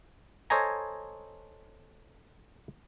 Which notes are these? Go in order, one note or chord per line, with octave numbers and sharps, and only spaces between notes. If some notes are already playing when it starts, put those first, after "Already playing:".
A4 C5 C#5 D#5 G#5 A#5